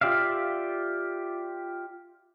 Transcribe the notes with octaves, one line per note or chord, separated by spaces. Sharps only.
F4 G4 D5 E5 F5